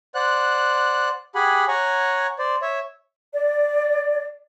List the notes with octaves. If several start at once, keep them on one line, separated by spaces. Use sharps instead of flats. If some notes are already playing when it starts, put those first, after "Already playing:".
C5 D5 F#5 F#6
G4 G#4 F#5 G#5 B5
C#5 F#5 G#5 A#5 C#6
C5 D5
C#5 E5
D5